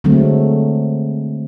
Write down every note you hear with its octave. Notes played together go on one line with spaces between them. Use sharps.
D3 F#3 G#3 A3 C4